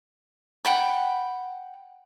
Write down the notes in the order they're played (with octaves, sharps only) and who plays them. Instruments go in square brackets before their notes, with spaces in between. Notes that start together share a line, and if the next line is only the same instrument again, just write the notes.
[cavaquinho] F#5 G5 B5